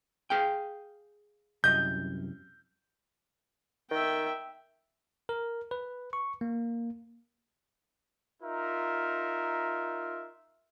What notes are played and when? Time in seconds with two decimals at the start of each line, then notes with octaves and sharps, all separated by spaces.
0.30 G#4 F5 G5
1.64 C2 F#2 D#5 G6
3.91 D#3 E5 G5
5.29 A#4
5.71 B4
6.13 C#6
6.41 A#3
8.43 D#4 F4 A#4 E5